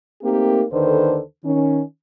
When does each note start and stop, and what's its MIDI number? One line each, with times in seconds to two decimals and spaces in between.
0.23 0.63 57
0.23 0.63 58
0.23 0.63 60
0.23 0.63 63
0.23 0.63 67
0.23 0.63 70
0.71 1.19 39
0.71 1.19 50
0.71 1.19 51
0.71 1.19 69
0.71 1.19 71
0.71 1.19 72
1.45 1.81 51
1.45 1.81 61